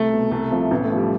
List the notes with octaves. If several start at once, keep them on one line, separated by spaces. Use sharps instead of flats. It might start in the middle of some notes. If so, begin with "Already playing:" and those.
Already playing: C2 A3
B2
C2 A3
C3 F3
A1 B3
A3
F3
G3